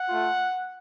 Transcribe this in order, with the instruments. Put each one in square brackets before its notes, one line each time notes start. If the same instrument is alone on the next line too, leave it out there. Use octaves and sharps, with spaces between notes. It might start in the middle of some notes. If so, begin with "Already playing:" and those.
Already playing: [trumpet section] F#5
A3 F4